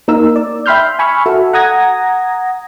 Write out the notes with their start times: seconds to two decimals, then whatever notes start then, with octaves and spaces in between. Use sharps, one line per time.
0.08 A#3 D#4 A#4 E6
0.36 D5
0.66 E5 G5 B5 C6 F6 G6
0.99 G#5 B5 C#6 E6 F6
1.26 F#4 A4 E5
1.53 F#5 A#5 D#6 G#6 A#6